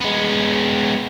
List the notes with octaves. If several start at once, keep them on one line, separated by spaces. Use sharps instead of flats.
G#3 B3